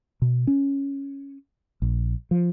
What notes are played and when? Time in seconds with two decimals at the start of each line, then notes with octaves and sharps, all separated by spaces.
0.22 B2
0.47 C#4
1.82 A#1
2.31 F3